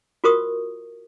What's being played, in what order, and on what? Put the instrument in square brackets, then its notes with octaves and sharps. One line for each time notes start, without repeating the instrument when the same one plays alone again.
[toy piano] F4 F#4 A#4 C5 C#6 D#6